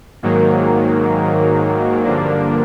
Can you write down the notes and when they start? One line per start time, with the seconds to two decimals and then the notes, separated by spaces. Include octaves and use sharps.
0.23 G#2 D#3 F#3 A#3
2.04 G2 D3 F3 A#3 D4